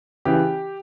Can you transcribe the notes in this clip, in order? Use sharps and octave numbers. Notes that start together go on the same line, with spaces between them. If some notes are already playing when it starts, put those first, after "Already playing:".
C#3 E3 G4